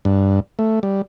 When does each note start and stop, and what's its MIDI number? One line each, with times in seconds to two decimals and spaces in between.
0.05 0.40 43
0.59 0.79 57
0.83 1.02 55